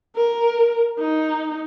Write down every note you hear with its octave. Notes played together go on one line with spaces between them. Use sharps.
A#4
D#4